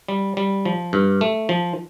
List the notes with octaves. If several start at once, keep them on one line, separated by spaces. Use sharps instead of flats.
G3
G3
F3
G2
A3
F3